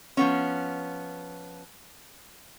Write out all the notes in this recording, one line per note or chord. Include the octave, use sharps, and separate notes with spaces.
F3 B3 C#4